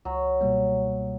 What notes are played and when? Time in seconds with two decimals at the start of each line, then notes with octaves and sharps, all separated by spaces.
0.05 C#2 F#3
0.41 B2 G3 A#3